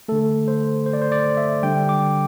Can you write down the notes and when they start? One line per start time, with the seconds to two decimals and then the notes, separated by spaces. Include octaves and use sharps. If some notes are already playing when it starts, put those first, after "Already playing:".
0.08 D3 A3 A4
0.48 C5
0.86 C5
0.93 D5
1.02 C5
1.12 D5
1.37 E5
1.63 D3 G3 G5
1.89 D6